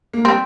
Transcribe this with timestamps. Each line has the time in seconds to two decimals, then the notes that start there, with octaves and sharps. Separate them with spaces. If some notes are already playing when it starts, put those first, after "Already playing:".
0.14 A#3
0.25 G3 C4